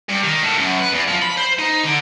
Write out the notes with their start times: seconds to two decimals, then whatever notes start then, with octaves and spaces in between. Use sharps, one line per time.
0.09 G2
0.23 D#3
0.43 A2
0.57 F#2
0.79 B4
0.91 E2
1.08 F3
1.22 B5
1.37 C5
1.59 D#4
1.84 D3